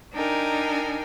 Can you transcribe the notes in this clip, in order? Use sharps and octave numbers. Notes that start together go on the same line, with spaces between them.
D4 D#4 A#4 G5 G#5